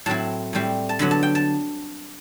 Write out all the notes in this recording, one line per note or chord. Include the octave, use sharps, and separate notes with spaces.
A2 F#3 C4 E4 A5
A2 G3 C4 E4
A5
D3 F#3 B3 B5
A5
G5
A5